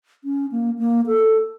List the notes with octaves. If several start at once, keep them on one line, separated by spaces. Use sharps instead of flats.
C#4
A#3
A#3
A4